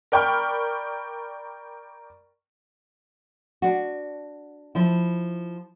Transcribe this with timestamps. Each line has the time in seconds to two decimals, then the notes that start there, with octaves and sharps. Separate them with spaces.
0.12 A#4 D5 G5 B5 C#6 F6
3.62 D4 F#4
4.75 F3 E4